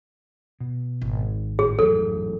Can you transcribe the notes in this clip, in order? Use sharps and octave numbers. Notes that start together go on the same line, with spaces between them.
B2
G#1
A2 G#4
A1 F2 G#2 C#3 F#3 A4